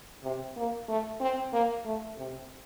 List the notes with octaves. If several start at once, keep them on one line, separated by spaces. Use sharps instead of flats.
C3
A#3
A3
C4
A#3
A3
C3